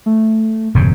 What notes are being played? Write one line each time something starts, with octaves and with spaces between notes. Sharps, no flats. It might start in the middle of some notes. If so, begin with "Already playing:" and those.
A3
E1 G2 C#3